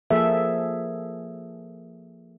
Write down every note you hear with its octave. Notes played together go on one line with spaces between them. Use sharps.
F3 A#3 G#4 A4 E5